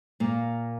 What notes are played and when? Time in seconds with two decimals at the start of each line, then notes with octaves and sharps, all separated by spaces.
0.20 A#2 A#3